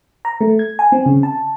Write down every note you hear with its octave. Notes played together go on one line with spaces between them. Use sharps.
A#5
A3
G#6
G#5
C4
C#3
A5